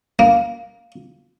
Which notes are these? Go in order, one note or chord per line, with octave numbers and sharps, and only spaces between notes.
A#3